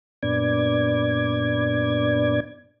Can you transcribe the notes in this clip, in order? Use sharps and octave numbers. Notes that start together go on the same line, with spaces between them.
F#2 A#2 B3 D4 D5 G#6